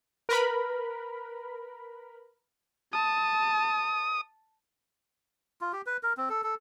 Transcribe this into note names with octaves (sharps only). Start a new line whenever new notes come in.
A#4 B4 B5
A5 D#6
F4
G4
B4
A#4
C4
A4
A4